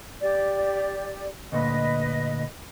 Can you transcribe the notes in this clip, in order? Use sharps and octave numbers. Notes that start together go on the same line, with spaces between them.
G4 D5
D2 A#2 B4 D#5